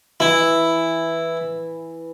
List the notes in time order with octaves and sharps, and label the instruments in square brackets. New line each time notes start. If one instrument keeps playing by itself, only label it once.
[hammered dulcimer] E3 [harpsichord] E4